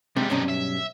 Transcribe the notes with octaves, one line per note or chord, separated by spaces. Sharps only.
G#2 C3 G3
B1 G2 C3 C#4 D#4
E5